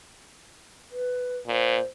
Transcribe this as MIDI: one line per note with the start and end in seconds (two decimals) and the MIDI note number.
0.91 1.36 71
1.47 1.79 46
1.47 1.82 72